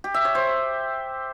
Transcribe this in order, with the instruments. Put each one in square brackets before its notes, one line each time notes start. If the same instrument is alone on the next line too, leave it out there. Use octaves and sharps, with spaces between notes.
[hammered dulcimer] G4
E5
C#5
C5